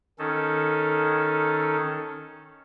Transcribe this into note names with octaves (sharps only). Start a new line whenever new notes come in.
D#3 C#4 D#4 A4